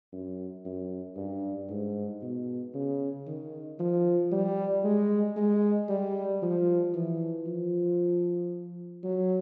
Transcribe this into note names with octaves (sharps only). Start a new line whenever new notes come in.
F#2
F#2
G2
G#2
B2
C#3
D#3
F3
G3
G#3
G#3
G3
F3
E3
F3
F#3